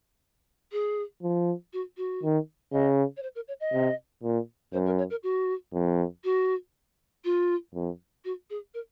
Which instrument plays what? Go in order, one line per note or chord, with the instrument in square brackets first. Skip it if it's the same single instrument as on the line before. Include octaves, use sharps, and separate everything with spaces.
[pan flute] G#4
[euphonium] F3
[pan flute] F#4
F#4
[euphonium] D#3
[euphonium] C#3 [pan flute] D#5
[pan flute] C#5
C5
A#4
C#5
D#5
[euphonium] C3
A#2
[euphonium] F#2 [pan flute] C5
[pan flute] A#4
C#5
A#4
F#4
[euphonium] F2
[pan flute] F#4
F4
[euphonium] F2
[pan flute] F#4
G#4
A#4